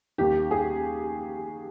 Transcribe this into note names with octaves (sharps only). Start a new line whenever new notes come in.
D#2 D#3 G4
G#4